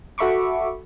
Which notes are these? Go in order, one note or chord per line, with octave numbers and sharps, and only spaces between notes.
F#4 A4 E5 B5 C#6 D6